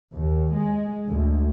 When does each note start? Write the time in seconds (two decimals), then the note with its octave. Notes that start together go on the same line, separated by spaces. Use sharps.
0.13 D#2
0.53 G#3
1.08 D2